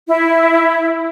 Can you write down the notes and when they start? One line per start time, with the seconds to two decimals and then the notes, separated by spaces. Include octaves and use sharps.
0.07 E4